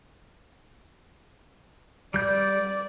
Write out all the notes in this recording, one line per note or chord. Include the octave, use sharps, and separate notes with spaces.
G3 D5 G6